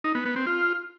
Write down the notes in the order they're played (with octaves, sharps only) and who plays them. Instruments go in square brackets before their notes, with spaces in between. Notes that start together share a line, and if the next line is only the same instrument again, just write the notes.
[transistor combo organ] D#4
B3
B3
C4
F4